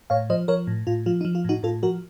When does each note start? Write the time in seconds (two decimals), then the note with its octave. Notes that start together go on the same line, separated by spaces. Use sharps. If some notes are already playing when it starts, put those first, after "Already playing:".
0.10 A2 C#5 F5
0.30 F3 C5 D#5
0.48 F3 A#4 C#5
0.67 A2
0.87 A2 F4
1.06 F3 F4
1.21 D#4
1.25 F3
1.35 F4
1.44 A2 D#4 F#4
1.63 A2 F4 A4
1.83 F3 F#4 A#4